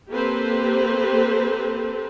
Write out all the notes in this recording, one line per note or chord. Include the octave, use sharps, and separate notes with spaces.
A#3 C4 G4 A4 B4 C5